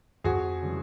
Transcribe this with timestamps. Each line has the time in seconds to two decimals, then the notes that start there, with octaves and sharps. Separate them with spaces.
0.24 F2 F#4 G#4
0.62 C#3 E3 G3